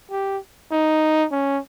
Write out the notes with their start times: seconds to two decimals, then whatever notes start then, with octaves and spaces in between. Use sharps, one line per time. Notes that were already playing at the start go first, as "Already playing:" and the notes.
0.11 G4
0.72 D#4
1.32 C#4